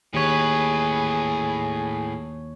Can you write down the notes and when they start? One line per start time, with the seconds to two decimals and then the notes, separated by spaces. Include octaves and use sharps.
0.14 D#2 A2 G#4 B4 C#5